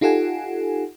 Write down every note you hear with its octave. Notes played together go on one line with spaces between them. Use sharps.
D#4 F4 G4 A4 F#5 G#5